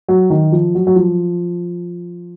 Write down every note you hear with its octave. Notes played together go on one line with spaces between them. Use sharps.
F#3
D#3
F3
F#3
F#3
F3